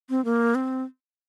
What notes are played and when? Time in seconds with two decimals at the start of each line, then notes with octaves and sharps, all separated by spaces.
0.10 C4
0.25 A#3
0.55 C4